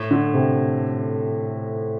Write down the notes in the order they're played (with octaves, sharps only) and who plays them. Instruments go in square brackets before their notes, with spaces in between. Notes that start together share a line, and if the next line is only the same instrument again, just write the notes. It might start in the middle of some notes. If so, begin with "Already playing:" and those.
Already playing: [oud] A2
[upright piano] D3
C3